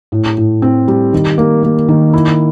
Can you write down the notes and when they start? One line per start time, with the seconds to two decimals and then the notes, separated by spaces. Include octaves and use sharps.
0.12 A2
0.37 A2
0.62 C4
0.88 G3
1.13 D#3
1.38 A#3
1.63 A#3
1.88 D#3
2.13 E4